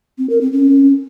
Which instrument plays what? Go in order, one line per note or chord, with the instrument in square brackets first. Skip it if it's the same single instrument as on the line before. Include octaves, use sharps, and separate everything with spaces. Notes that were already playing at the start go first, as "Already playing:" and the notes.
[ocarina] C4
A#4
C4
C#4